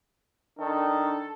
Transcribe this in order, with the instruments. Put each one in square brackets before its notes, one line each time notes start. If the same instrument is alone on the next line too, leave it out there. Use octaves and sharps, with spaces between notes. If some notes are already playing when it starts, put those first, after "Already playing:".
[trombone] D#3 [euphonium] D4 [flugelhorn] A4